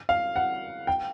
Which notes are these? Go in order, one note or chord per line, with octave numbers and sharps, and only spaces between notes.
F5
F#5
G5